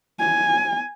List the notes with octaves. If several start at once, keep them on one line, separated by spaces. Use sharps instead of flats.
G#5